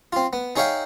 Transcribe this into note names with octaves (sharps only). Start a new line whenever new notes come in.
C4 F4
B3
D#4 G#4 C#5 E5 F5 G5